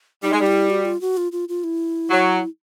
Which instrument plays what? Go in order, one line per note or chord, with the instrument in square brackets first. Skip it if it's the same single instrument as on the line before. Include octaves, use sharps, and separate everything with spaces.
[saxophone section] G3 [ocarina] D#4
[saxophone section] G#3
G3
[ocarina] E4
F#4
F4
F#4
F4
F4
F4
E4
[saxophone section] F#3